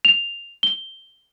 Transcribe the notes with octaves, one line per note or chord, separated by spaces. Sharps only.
F7
G7